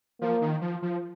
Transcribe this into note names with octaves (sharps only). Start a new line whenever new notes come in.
F3 A#3
D#3
F3
F3